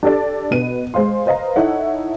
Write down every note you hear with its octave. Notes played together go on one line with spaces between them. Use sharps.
D4 G4 A4 D5
B2 B3 B4 D#7
G#3 C5 F5 C6
B4 C5 D#5 F5 A#5
D#4 E4 A4 C#5 F#5